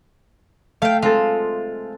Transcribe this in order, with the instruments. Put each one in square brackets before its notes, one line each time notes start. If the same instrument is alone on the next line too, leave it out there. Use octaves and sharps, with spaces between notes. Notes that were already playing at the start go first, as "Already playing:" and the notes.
[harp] A3 [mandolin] F5 G5
[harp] G#3 C4 A4 [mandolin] F4